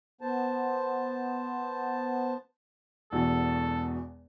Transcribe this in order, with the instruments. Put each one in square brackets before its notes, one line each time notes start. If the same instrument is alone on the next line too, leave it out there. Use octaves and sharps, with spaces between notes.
[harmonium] B3 C5 A5
[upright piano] E1 E2 B2 [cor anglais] A4